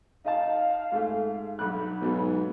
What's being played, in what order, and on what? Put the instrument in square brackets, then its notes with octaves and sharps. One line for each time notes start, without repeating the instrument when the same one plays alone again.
[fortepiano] D#4 D#5 A5 [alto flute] F5
[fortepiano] G#2 A3
[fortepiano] B1 G2 F#6 [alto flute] B5
[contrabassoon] B1 [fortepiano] G#2 F#3